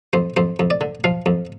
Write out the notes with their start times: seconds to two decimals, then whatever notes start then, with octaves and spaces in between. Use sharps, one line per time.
0.13 F2 C5
0.37 F2 C5
0.59 F2
0.70 D5
0.81 D3
1.04 F3 F5
1.26 F2